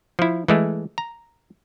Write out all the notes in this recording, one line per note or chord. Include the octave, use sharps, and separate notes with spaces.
F3 E4
E3 G#3 A3
A#5